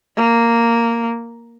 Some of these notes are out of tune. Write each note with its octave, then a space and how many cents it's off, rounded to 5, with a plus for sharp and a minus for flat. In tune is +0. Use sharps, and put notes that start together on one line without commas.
A#3 -5